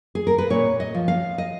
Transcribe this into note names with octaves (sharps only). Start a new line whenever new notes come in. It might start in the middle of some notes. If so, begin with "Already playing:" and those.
G#4
A#4
B4
A#2 C#5
D#5
F3
F5
D#5